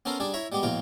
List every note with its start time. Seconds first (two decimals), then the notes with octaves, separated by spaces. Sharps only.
0.05 B3 C#4 A4 A#4 C5
0.20 G3 D4 G#4 D5
0.34 E4 C#5 E5 A#5
0.52 G3 G#3 B3 G4
0.63 A#1 E2 B2 F#3 F4 G5